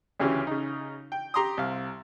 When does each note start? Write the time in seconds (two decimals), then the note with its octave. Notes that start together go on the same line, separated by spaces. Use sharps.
0.19 D2 C#3 E3 C#4 G4
0.47 C#3 D#4
1.12 G5
1.34 G4 A#5 C6 D6 D#6
1.57 C2 F5